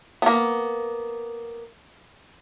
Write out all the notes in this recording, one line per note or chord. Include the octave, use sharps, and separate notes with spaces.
A#3 B3